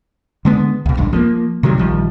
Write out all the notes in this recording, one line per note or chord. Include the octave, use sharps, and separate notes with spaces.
D3 G#3 B3
C#2 B2
D1 A1 G2
F3 G#3 A#3
C3 D#3 F#3 G3
A#1 D#3 F3 G3